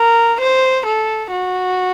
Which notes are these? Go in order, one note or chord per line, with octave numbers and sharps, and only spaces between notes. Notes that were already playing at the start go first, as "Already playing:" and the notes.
Already playing: A#4
C5
A4
F#4